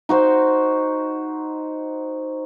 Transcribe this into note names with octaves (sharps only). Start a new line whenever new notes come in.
D#4 F#4 C5